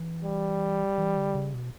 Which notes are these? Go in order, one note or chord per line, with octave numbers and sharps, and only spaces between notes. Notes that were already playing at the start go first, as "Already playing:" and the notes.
Already playing: E3
G3
E3
D3
C#3
B2